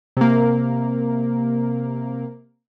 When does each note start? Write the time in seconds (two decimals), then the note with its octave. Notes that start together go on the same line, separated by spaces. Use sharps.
0.17 C3 A#3